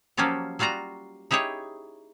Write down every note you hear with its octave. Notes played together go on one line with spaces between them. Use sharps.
F3 F#3 A#3 C#4 F4 G4
F#3 G3 F4 F#4 A#5
D#4 E4 G4 G#4 C#5